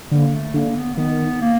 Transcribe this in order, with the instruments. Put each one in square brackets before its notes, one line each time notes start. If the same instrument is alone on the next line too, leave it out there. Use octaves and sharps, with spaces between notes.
[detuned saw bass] D3 [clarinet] A#3
[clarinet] A3
[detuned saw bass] D3 [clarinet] A#3
[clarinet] B3
A#3
[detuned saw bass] D#3 [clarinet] B3
[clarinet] A#3